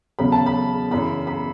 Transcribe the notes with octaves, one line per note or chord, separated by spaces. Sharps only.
E2 C#3 F#3 B5
A5
B5
F#2 C#3 E3 B5
B5